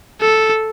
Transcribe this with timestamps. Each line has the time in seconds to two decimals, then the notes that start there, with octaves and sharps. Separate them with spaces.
0.21 A4